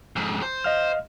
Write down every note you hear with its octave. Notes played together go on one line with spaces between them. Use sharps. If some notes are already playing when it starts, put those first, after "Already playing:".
F2 G#2
C5
D#5 F5 F6